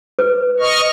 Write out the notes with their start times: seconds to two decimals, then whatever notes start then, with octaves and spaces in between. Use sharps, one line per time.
0.19 B4
0.60 D#5 C#6 F6